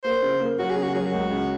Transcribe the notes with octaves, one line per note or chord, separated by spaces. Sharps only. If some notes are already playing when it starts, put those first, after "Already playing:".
A#3 C5
C#3
A#3
F#3 F#4
G#4
C#3
F#4
F#3 G#4
F#4
C#2
C#3